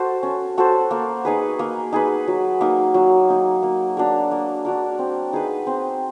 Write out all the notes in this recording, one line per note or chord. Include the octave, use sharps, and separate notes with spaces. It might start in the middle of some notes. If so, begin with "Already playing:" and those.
Already playing: F#4 A4 C5
C#4
F#4 A4 C5
A#3
D#4 G#4 B4
A#3
D#4 G#4 B4
F#3
A#3 D#4
F#3
A#3 D#4
A#3
D4 F#4 A#4
A#3
D4 F#4 A#4
C4
D#4 G#4 B4
C4